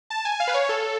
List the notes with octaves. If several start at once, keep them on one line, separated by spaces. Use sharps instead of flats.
A5
G#5
F5
B4
C#5
A4